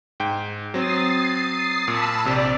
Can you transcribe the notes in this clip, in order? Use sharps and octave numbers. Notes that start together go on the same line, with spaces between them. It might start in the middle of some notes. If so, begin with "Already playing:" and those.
G#2 G5
F#3 C4 D#6 A6 C7
A#2 A5 B5 E6
A#1 C3 D5